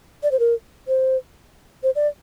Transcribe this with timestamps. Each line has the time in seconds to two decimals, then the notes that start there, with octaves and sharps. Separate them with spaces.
0.23 D5
0.32 C5
0.39 A#4
0.88 C5
1.83 C5
1.96 D5